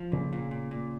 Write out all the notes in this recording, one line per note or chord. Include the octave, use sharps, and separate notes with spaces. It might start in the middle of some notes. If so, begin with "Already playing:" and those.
Already playing: F3
A#2 C#3
A#2
A#2
A#2